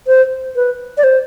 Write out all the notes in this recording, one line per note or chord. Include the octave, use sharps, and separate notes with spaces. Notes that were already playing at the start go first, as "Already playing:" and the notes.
C5
B4
D5
C5